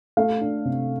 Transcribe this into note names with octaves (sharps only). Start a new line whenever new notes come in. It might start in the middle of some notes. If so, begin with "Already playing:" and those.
A3 F5
D4
C3